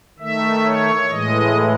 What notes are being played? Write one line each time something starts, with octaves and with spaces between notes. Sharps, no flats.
D#3 A3 E5
C#5
A2 E3 G#3 D#5